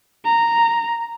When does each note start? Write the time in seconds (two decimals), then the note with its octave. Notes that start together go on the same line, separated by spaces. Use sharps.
0.25 A#5